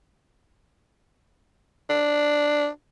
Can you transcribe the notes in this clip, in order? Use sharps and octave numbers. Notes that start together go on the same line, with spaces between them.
D4